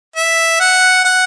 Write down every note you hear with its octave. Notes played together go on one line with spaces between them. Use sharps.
E5
F#5
F#5